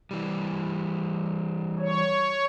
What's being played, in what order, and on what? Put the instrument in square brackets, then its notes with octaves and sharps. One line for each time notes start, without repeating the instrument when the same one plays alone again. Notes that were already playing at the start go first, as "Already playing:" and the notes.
[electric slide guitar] E3 G3
[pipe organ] C#5